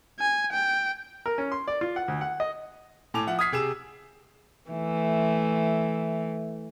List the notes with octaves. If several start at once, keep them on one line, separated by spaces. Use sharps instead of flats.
G#5
G5
A#4
C#4
C6
D5
F4
F#5
D2
F#5
D#5
A2 G#5 A5 D6 F7
F3 E5 F#5
D#6 F6 G#6 B6 C7
C3 G#4 E6 E7
E3 A3